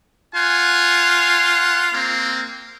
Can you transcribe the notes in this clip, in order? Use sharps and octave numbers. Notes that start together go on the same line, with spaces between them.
F4 F#5 G#5
A#3 C4